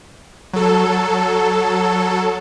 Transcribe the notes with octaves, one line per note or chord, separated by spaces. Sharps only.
F#3 A4